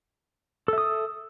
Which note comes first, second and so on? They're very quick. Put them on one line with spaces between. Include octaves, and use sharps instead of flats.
A4 E5 D#6